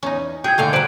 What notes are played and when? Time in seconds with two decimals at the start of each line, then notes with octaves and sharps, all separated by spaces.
0.03 E2 C#4 D#4
0.44 F#3 G#4 G5 G6 G#6
0.58 D#2 G#2 D3 A3 F5
0.73 F#3 G3 B4 C5 D7